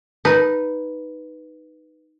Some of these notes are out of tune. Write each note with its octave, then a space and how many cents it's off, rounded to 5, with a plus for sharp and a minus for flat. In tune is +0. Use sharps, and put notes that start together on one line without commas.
D#4 +0 B4 +0